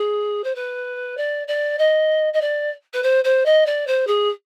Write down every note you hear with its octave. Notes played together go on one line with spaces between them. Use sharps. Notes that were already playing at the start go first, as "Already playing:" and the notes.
Already playing: G#4
C5
B4
D5
D5
D#5
D#5
D5
B4
C5
C5
D#5
D5
C5
G#4